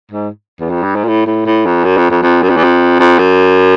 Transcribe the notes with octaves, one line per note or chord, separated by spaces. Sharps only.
G#2
E2
F2
G2
G#2
A#2
A2
A2
A2
F2
F#2
F2
F2
F2
F#2
F2
E2
F2
F2
F#2